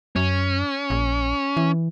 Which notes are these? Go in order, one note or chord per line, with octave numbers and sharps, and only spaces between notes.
F#2 C#4
A#1
E3